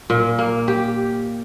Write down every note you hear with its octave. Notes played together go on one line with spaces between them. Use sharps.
A#2
A#3
G4